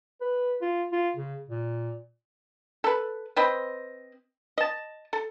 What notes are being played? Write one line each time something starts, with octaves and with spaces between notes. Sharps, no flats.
B4
F4
F4
C#3
A#2
A4 B4
C4 B4 C5 D#5
D#5 A5
A4